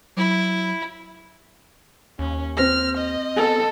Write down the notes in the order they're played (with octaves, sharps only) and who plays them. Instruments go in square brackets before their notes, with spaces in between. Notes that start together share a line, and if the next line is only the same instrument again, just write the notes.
[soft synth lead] F#3 [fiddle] E4
[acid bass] D#2 [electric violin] C#4
[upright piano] C4 A#6 [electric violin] F6
[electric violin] D#5
[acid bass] B3 [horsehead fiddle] A4